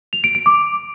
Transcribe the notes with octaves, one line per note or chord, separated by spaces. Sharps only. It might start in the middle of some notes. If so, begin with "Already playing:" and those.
F7
D7
D7
D6